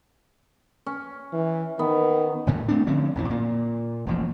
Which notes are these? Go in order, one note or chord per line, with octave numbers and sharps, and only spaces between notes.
C#4
E3
D#3 B3
F#1 F2 A2 C3
A3 C4 D4
D3 F3 C4 C#4
A#1 F2 E3
A#2 A#3
E1 A1 F3